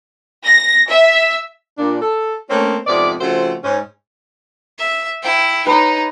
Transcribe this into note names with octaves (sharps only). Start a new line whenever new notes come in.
A#6
E5
A#2 D4
A4
A3 A#3 C4 C#4
F2 G#2 C3 B3 D5
C#3 F3 A3 C4 F#4 C5
G#2 C#4
E5
E4 G5
D#4 B4 C#5